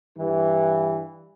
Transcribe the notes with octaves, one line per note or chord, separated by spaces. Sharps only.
G2 E3